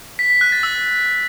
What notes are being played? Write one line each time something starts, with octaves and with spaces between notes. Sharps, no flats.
B6
B6
F#6
A6
E6